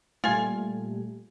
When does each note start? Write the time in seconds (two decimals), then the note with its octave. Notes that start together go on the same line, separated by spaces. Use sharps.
0.24 A#2 G3 A3 F4 G#5